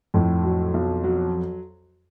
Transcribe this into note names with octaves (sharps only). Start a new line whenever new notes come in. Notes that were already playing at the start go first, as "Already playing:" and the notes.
F2 A2
F#3
B1
F#3